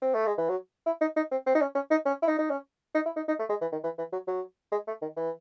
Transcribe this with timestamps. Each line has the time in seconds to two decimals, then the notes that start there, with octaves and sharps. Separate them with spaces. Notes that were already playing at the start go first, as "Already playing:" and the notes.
0.02 C4
0.15 A3
0.26 G#3
0.38 E3
0.49 F#3
0.86 E4
1.01 D#4
1.17 D#4
1.31 C4
1.46 C4
1.55 D#4
1.61 C#4
1.75 C#4
1.91 D#4
2.06 C#4
2.22 E4
2.28 D#4
2.39 D#4
2.50 C#4
2.95 D#4
3.06 E4
3.16 D#4
3.28 D#4
3.39 A3
3.49 G#3
3.61 E3
3.72 D#3
3.84 E3
3.98 E3
4.13 F#3
4.27 F#3
4.72 G#3
4.87 A3
5.02 D#3
5.16 E3